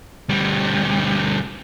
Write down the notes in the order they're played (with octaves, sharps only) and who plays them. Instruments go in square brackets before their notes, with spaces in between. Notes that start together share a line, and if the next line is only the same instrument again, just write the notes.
[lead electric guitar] D2 G3